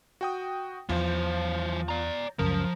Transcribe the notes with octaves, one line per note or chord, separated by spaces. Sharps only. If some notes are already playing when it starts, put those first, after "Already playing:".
F#4 G5 D#6
E2 E3 F3 C5 G6
D5 A#5
C#2 F#2 C#3 F3 A#4